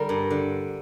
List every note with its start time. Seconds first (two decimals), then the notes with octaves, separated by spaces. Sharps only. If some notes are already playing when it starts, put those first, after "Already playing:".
Already playing: D3 G3 A#4 C5
0.09 G2
0.30 D3